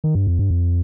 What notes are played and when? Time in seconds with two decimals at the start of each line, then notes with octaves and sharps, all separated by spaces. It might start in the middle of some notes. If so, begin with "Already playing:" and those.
0.04 D#3
0.15 G2
0.27 F2
0.39 G2
0.51 F2